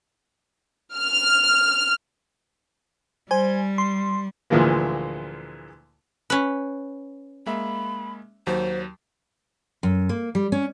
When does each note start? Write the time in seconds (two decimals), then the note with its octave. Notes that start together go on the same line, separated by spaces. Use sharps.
0.95 F6
3.31 G3 C5 G#5
3.78 C6
4.50 D2 A#2 E3 F3 G#3 A#3
6.30 C#4 B4
7.46 G#3 A#3 E5 B5
8.47 D#2 F#3 C5
9.83 F#2
10.09 A#3
10.35 G3
10.52 C#4